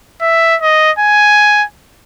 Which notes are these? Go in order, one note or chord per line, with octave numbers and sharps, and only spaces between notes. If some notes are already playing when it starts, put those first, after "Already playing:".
E5
D#5
G#5